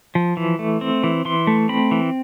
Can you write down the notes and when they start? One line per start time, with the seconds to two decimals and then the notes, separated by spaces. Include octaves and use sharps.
0.15 F3
0.37 E3
0.59 A3
0.81 C4
1.04 E3
1.25 E3 C6
1.47 A3
1.69 C4 B5
1.91 E3